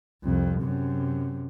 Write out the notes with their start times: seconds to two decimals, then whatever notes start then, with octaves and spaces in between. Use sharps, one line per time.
0.23 C2 F2
0.61 F#2 C3